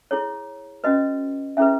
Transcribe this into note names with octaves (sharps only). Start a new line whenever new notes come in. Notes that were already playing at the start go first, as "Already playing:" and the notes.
E4 G#4 C#5
C#4 F#4 B4 D#5
C#4 E4 G#4 B4 E5